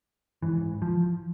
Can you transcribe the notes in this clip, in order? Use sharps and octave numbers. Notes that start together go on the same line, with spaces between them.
G#2 E3
F3